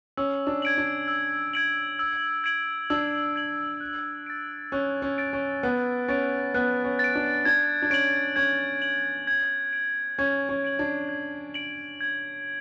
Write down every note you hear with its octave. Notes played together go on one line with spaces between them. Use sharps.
C#4 E6
D4
G#6 D7 F#7
D4
E6
G#6 D7 F#7
E6
G#6 D7 F#7
D4 E6
G#6 D7 F#7
F#6
A6 D7
C#4 F#6
C#4
A6 D7
C#4
B3 F#6
C#4 A6 D7
B3 F#6
C#4
A6 D7
D4
D4 G#6
D4
C#4 D7 F#7
C#4 G#6
D7 F#7
G#6
D7 F#7
C#4 G#6
C#4
D7 F#7
D4
G#6
D7 F#7
G#6